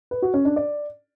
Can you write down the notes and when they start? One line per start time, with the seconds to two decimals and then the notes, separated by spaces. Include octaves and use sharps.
0.11 B4
0.22 F#4
0.34 C#4
0.45 D4
0.56 D5